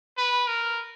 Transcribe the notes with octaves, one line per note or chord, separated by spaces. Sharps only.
B4
A#4